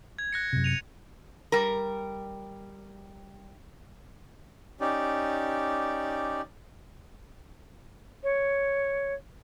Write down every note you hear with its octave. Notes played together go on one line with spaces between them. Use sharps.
G#6
F#6 A#6 C#7
F#2 C3
C#7 D#7 F7
G3 A#4
C#4 D#4 G4 D5
C#5